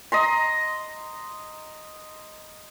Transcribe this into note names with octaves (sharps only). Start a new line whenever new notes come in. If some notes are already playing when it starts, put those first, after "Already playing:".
D#5 A#5 C6